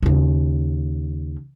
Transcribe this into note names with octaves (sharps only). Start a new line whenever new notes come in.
D#2 C#3